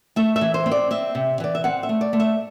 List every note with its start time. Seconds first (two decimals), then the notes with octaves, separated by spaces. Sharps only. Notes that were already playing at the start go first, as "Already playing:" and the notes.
0.16 A3 E5
0.36 E5
0.41 E3
0.54 C5
0.66 C4
0.71 D5
0.91 C4 E5
1.15 C3
1.40 E3 D5
1.55 E5
1.64 C4 F#5
1.83 E5
1.89 A3
2.01 D5
2.13 A3
2.20 E5